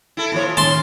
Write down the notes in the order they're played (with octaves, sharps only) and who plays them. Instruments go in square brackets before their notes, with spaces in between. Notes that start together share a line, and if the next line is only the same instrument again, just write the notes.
[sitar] E4 A4
A#2 F3 C#5
[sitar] D#2 C#4 [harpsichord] A5 C6